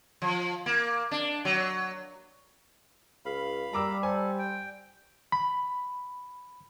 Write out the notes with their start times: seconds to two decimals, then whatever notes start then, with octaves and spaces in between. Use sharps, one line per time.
0.22 F3
0.66 A#3
1.11 D4
1.45 F#3
3.25 C#2 F5 B5
3.73 G3 A#3 A#5 D6 E6
4.03 A4 C5 G#5
4.39 G5
5.32 B5